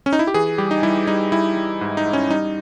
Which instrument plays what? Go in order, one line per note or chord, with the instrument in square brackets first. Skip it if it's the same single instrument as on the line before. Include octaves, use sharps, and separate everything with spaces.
[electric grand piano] C#4
D#4
E4
G4
E3 G#4
G3 G4
D#4
G3 E4
G3 D#4
G3 E4
G3
G#2
D#4
G#2
C#4
G3 D#4